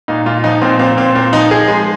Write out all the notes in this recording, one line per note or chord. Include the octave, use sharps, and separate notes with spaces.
A#2 D#4
A#2 F4
F3 D#4
A#2 C4
A#2 C4
A#2 C4
A#2 C4
F3 D#4
F3 G#4
G#3